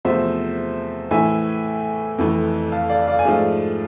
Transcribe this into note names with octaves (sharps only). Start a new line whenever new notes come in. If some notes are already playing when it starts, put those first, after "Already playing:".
E2 C3 F3 A3 C5 E5
A2 E3 A3 E5 G#5
F2 E3 A3
F5 A5
D5 F5
D5 F5
G#5
G#2 F3 A3 D5 F5